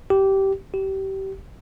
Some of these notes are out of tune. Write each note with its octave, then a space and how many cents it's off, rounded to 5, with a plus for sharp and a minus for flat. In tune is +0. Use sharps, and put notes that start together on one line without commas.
G4 -15
G4 -25